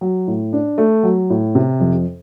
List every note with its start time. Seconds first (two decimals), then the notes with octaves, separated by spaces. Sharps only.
0.01 F#3
0.28 A2
0.53 D4
0.78 A3
1.03 F#3
1.30 A2
1.55 C3
1.80 F2